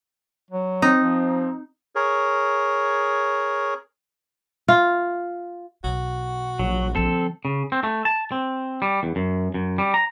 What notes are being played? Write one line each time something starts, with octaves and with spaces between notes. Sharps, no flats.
F#3
C4 D#4
F3
G#4 A#4 C#5
F4
B1 F#4
A#1 F#3
D3 F3 C4 A4
C#3
C4
A3
A5
C4
G3
E2
F#2
F#2
G3
A#5